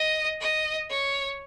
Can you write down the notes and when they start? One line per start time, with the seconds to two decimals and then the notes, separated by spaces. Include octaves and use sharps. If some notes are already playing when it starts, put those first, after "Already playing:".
Already playing: D#5
0.40 D#5
0.90 C#5